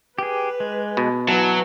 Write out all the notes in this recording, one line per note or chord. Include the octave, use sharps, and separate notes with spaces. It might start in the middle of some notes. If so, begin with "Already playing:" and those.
G4 G#4 B4
G#3
B2
E3 F#3 A5